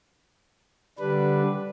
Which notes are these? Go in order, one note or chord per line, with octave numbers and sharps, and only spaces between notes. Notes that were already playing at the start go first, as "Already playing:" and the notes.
D3 G3 D4 B4